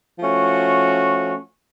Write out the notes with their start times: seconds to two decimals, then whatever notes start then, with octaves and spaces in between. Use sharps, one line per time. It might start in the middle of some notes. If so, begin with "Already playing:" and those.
0.19 F3 A3 C#4 F#4